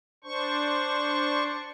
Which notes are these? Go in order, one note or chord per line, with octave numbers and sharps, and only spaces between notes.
D4 C5 C#6